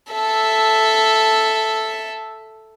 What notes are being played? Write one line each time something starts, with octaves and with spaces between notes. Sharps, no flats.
A4 E5